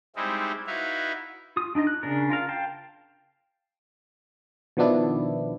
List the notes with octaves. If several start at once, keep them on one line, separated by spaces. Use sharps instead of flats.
G3 G#3 C4 D#4 E4
D#4 E4 F#4 B4 E5 F5
F4 D#6
D4 D#4 F4 D#5
F#6
C#3 D4 A#4
F4 A#4 F5
F5 G5 A5
B2 D#3 F3 B3 D4 E4